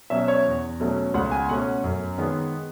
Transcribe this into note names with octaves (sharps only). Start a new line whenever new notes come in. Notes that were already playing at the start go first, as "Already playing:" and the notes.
B2 F#3 C#4 E5
C#5
E2
B2 F#3 A3 C#4
C#2 F#5
G#5
B2 A3 C#4 F#5
F#2
D#3 G#3 B3